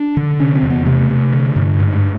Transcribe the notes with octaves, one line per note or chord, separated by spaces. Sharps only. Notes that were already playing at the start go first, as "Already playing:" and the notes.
Already playing: D4
D3
C3 C#4
C4
E2
B3
C3 A3
C3
D3
G2
G#2